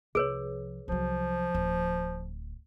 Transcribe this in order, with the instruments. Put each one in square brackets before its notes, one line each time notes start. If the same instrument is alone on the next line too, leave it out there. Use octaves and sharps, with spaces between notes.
[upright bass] C2 F3 [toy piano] G#4 B4 C#5
[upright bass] C2 F#3 [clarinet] F3
[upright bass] D1